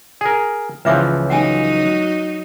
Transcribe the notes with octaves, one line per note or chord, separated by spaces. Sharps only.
G#4 A#4
C#2 E3 F3 B4 E5 D6
F#3 D#4 F#5 G#5